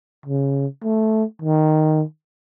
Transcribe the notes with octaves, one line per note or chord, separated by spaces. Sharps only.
C#3
A3
D#3